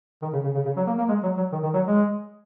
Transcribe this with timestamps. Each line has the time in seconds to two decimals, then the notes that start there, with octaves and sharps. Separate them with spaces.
0.22 D#3
0.33 C#3
0.44 C#3
0.54 C#3
0.65 C#3
0.76 F#3
0.87 A#3
0.98 A#3
1.08 G#3
1.23 F#3
1.37 F#3
1.52 D#3
1.63 D#3
1.73 F#3
1.85 G#3